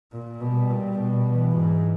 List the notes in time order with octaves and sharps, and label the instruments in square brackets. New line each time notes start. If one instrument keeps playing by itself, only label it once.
[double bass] A#2
[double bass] B2 [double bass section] G3
[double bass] A#2
B2
[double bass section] E3
[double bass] G#2